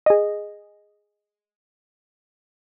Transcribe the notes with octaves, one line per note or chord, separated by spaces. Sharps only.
G#4 D#5